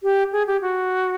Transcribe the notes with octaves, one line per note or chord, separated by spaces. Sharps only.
G4
G#4
G4
F#4